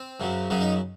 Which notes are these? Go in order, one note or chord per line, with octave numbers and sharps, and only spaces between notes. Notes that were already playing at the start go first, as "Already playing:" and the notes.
Already playing: C4
F#2 C#3 F#3
F#2 C#3 F#3 C#4
D#4